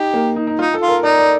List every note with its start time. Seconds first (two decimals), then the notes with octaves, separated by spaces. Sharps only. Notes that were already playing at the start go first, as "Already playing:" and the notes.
Already playing: D#4 G4
0.14 A#3
0.36 D#4
0.47 D#4
0.59 D#4 F4
0.74 A4
0.81 F4
0.88 A#4
1.03 D#4 D5
1.19 D5